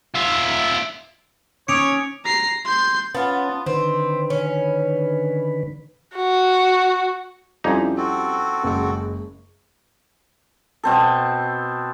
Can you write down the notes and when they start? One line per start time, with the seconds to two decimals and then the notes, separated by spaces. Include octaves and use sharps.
0.14 F4 E5
1.68 C#4 C#5 D6 D#6 C#7 D7 F7
2.25 A#5 C7
2.65 C6 G6
3.15 B3 C#4 F4 A5
3.66 D3 D#3 C4 B4
4.30 C#4
6.16 F#4
7.64 F2 G3 C#4 D#4 E4 G4 E5
7.97 C4 F#4 A4 G5
8.64 F#1 G#3 C#6
10.83 B2 C4 A4